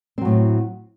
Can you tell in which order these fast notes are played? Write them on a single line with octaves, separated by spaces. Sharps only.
C4 F#3 A2